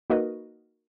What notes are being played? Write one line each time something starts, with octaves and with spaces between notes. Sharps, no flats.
A#3 D#4 F#4 A#4 B4 D#5